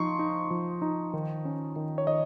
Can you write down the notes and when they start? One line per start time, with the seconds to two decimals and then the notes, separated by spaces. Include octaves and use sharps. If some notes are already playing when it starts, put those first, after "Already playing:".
Already playing: F3 D#4 C6 C#6
0.19 D#4
0.51 F3
0.82 D#4
1.13 D#3
1.45 C#4
1.76 D#3
1.98 C#5
2.07 D#3 D#5